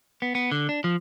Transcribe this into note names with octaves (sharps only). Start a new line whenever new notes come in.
B3
B3
D3
D4
F3